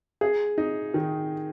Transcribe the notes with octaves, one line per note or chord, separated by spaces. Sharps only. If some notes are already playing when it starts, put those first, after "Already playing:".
G#4
D#4
D#3